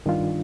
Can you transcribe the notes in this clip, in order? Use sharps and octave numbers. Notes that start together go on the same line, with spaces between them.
G2 D#3 G3 D4 F4